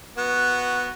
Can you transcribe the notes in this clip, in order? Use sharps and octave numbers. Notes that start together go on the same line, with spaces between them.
B3 F#4